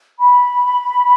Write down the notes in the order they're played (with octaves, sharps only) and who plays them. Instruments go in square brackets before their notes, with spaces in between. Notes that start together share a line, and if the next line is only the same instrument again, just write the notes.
[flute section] B5